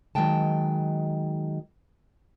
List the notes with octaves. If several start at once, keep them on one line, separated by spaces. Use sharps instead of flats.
D#3 F#3 G#3 G5 A5